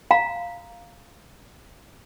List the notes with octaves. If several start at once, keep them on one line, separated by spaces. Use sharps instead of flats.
F5 A#5